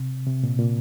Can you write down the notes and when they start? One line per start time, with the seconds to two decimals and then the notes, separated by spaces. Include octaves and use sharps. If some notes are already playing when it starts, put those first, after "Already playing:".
Already playing: C3
0.27 C3
0.43 A#2
0.59 A#2